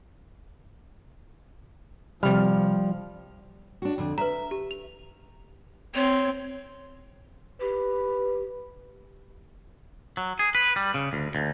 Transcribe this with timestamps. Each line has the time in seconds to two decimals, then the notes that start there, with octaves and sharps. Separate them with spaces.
2.23 C3 F3 G3 F6
3.82 D4 F#4
3.98 F2 D3
4.18 B4 E5 A#5
4.51 G4
4.71 F7
5.95 C4 C#5
7.61 G4 B4
10.17 F#3
10.39 G#4
10.55 B4
10.76 G3
10.94 C#3
11.13 D2
11.35 D2